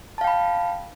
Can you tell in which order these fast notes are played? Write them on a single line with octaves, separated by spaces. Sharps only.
A5 F5 G5 B5